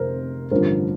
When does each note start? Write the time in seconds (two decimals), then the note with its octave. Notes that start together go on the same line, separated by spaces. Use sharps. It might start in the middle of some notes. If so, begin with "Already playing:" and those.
Already playing: F1 A#4 C5
0.51 A1 G2 D3 F3 A#4 C5